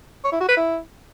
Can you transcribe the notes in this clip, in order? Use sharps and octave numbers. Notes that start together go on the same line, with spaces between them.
C#5
E4
F#4
B4
E4